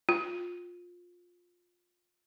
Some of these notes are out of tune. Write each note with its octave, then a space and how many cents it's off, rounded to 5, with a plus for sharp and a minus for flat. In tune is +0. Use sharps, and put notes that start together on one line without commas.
F4 +15